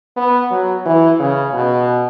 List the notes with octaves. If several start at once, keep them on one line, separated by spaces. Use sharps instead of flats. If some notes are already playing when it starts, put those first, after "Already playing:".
B3
F#3
E3
C#3
B2